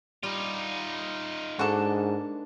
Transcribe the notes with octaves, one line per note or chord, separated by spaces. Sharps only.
G3 D#4 F4
G#2 A#3 D4 F#4 A4